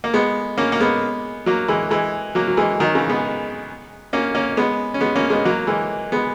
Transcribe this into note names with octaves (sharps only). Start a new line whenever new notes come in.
A#3
G#3 B3
A#3 C#4
A#3
G#3 B3
F#3 A#3
E3 G#3
E3 G#3
F#3 A#3
F#3
E3 G#3
D#3 F#3
C#3 E3
G#3 B3
A#3 C#4
A#3 C#4
G#3 B3
C#4
G#3 B3
A#3 C#4
G#3 B3
F#3 A#3
E3 G#3
G#3 B3